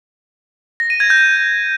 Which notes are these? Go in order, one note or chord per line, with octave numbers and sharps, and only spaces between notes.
A#6
D#7
G#6
G6